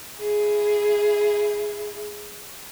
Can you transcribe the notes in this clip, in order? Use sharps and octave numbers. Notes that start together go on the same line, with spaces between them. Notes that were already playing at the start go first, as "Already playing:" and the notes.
E4 G#4